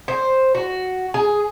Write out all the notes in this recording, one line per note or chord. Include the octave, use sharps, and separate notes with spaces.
C5
F#4
G#4